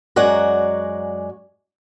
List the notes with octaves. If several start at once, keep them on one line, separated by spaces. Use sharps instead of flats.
F#2 G#3 F#4 D5 F#5 A#5